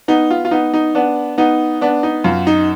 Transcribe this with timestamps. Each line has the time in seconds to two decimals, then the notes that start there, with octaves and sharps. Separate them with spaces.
0.08 B3 D#4
0.31 F4
0.45 F4
0.51 B3 D#4
0.74 D#4
0.95 B3 D4
1.38 B3 D#4
1.81 B3 D4
2.03 D#4
2.24 F#2 F4
2.47 D#4